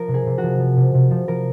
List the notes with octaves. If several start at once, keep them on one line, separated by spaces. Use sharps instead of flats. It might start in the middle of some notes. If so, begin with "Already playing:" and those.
Already playing: F3 A#4
C3
G#4
C3
F#4
F3
F3
C3
C3
F3
F3 A#4